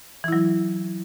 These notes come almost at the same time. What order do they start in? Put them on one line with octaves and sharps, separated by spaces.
E3 E4 F#3